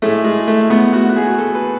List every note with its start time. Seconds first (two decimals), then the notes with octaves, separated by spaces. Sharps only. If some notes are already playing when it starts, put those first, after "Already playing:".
0.02 A2 G#3 A3
0.24 G#3
0.48 A3
0.70 B3
0.93 F#4
1.09 F#4
1.16 G#4
1.38 A4
1.55 B4